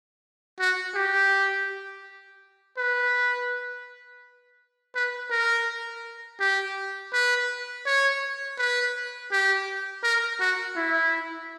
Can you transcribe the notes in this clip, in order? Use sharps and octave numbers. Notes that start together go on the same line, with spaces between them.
F#4
G4
B4
B4
A#4
G4
B4
C#5
B4
G4
A#4
F#4
E4